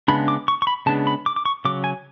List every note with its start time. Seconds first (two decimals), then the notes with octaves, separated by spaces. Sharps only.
0.08 C#3 G#3 B3 D4 B5
0.28 D6
0.48 C#6
0.62 C#6
0.67 B5
0.86 C#3 G#3 B3 D4 A5
1.07 B5
1.26 D6
1.36 D6
1.45 C#6
1.65 C#3 F#3 D6
1.84 G#5